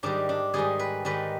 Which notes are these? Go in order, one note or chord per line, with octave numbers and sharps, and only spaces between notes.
G#2 D#3 G3 D4
D4
G#2 D#3 G3 G#4
B4
G#2 D#3 G3 B4